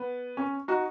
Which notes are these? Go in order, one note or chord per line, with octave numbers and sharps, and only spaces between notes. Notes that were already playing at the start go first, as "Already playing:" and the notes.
Already playing: B3
C#4
D#4 F#4